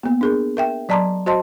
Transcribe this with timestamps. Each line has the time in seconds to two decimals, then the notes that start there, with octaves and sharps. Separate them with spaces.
0.03 A#3 B3
0.21 D4 G#4 A#4
0.57 A#4 E5 G5
0.89 F#3 D5 A5 A#5 C6 D6
1.26 F#4 C5 D#5 A5 C6